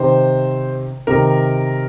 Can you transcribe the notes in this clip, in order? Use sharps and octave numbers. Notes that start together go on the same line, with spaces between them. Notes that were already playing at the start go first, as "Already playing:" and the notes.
Already playing: C3 D#3 C5
C3 D#3 A#4